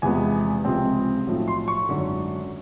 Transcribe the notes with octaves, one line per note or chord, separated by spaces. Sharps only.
E2 C3 F3 G#3 B3 G#5
C#2 C3 F3 G#3 C4
B1 A2 F3 A3
C6
C#6
G#1 F#2 D3